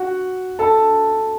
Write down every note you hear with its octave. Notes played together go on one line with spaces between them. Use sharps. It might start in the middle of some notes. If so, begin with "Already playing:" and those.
Already playing: F#4 F#5
A4 A5